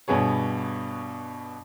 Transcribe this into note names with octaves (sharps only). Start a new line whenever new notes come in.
G2 B2 B3 G#4 C#5